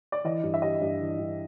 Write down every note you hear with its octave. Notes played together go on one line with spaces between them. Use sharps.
D5
E3 D#5
G2
E5
G3 D#5
G2
E3
G2